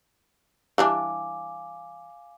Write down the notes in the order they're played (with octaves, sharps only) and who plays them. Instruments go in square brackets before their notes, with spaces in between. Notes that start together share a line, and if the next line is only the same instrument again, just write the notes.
[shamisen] E3 G3 D4 [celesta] F5 G#5 D6